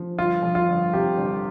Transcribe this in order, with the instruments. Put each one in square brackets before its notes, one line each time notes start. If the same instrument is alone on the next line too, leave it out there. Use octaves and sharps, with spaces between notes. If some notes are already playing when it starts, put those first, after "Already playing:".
Already playing: [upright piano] F3
[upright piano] G1 [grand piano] F4
[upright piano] F2
[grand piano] F4
[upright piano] G1
[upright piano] C3 [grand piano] G4
[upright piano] G1